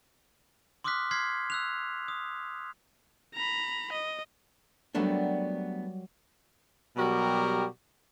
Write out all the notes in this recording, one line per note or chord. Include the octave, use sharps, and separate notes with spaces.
C6 D6 D#6 F6 F#6 B6
C6 F6 G#6 B6 C7
E6 F#6 F7
D#6
A#5 B5
D#5
F#3 G3 A3 B3 D4 A#4
B2 F#3 G3 F#4 G4 A#4